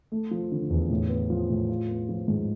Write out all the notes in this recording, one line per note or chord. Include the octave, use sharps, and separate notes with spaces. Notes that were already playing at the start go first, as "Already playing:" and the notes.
A3
F3
D3
E2
A2
B3
F3
A2
F4
B3
F3
G#2